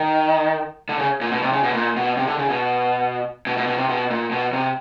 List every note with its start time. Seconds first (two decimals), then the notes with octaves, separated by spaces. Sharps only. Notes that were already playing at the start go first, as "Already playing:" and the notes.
Already playing: D#3
0.89 D3
0.99 C#3
1.21 A#2
1.32 B2
1.42 C3
1.52 C#3
1.63 B2
1.74 A#2
1.96 B2
2.17 C3
2.27 D3
2.39 C#3
2.50 B2
3.47 B2
3.57 B2
3.67 B2
3.78 C3
3.89 B2
4.10 A#2
4.31 B2
4.53 C3